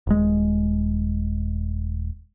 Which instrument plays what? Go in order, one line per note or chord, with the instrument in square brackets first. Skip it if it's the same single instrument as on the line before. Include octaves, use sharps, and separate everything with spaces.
[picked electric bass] D#1 G#3